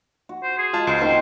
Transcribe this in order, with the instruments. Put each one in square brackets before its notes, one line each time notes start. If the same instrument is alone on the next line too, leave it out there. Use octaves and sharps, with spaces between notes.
[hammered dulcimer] F#4
[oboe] C5
G#4
[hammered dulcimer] G#3 [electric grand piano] F4 A5
[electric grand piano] C#2 [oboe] C5
[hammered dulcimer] D#3 A#3 C4 [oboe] C5